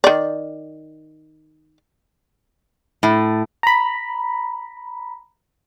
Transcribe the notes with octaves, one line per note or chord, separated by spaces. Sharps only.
D#3 D5
A2
A#5 B5